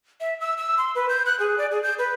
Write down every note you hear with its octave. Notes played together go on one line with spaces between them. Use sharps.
E5
E6
E6
C6
B4
G6
F#6
G#4
D5
G#4
G6
B4